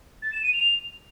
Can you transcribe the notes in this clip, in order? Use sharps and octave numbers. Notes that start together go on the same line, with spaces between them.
A6
E7
D#7
F7